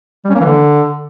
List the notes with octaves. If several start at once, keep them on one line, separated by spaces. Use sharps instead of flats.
G3
C#4
A#3
E3
D3